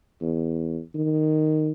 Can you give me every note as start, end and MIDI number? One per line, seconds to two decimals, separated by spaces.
0.21 0.80 40
0.95 1.72 51